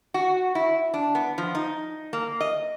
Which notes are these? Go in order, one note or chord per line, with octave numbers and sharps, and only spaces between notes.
F#4
E4
D4
B3
F3
D#4
A#3
D#5